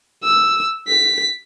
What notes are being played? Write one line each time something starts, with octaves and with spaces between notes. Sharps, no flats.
E6
B6